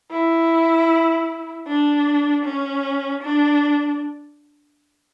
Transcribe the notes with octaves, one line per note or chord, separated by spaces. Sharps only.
E4
D4
C#4
D4